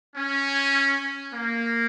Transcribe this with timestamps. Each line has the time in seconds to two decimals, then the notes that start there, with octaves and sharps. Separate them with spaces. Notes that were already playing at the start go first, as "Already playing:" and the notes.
0.16 C#4
1.33 A#3